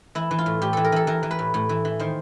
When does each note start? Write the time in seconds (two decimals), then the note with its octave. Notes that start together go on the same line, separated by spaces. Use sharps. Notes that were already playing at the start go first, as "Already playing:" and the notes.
0.15 E3 E4
0.31 E3
0.38 F4
0.46 A2
0.62 A2 G4
0.73 E3 A4
0.84 A#4
0.92 E3 A4
1.07 E3 A#4
1.23 E3
1.31 B4
1.39 A2
1.54 A2
1.69 E3
1.85 E3
1.99 D#3 C5